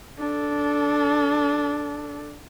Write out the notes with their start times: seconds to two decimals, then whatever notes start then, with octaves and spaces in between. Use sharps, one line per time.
0.19 D4 A4